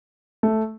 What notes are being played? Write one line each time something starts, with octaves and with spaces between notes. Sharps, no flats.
A3